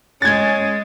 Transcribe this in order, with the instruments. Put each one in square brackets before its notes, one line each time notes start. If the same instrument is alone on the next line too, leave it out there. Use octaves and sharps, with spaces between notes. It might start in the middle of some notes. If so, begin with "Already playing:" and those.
[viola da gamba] G#3 [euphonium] C#4 [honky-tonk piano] G#6 A6